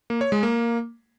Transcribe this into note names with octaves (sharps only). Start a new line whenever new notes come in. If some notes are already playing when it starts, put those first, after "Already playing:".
A#3
C#5
G#3
A#3